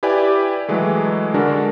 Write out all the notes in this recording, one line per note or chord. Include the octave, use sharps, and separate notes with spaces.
E4 G4 B4 D5 G#5 D6
E3 F#3 G#3 A3
D3 G#3 D4 F#4 A#4